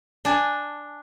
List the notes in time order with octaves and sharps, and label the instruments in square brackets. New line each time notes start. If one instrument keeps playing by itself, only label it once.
[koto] D4 [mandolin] G#5 A5